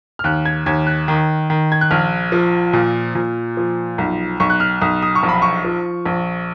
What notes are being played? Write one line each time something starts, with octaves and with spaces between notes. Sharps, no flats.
F6
D#2 F#6
G#6
D#2 G#6
F#6
D#3
D#3
G#6
F#6
A#1 F6
F3
A#2
A#2
F3
B1
B1 C#6
F#6
F6
B1 D#6
D#6
C#6
A#1
B5
C#6
F3
A#1